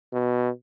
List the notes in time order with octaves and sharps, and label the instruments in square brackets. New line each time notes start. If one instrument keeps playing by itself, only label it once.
[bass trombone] B2